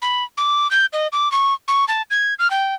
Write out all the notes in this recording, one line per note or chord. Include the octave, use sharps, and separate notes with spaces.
B5
D6
G6
D#5
D6
C#6
C#6
A5
G#6
F6
G5